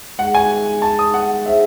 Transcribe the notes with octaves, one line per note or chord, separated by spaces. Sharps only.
G#3 D#4 G#4 F#5
G#5
A5
D#6
F#5
D#4 G#4 C5 E5 F#5